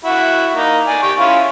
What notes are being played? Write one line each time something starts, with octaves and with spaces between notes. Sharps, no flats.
E4 F#4
A#3 D#4
D5 G#5
G4 G5 C#6
C#4 E4 F4